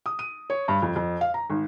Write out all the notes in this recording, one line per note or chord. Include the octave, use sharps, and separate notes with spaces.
D#6
D#7
C#5
G2
F2
F2
F5
A#5
G#1